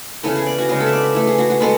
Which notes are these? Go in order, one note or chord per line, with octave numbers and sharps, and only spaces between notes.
C#3 E3 B3 A4
G#4
D5
F#4
C#3 G#3 B3 G#4
A4
E5
D5
E5
E3 A3
G#4
F#4
F#4
B2 G#3 B3 A4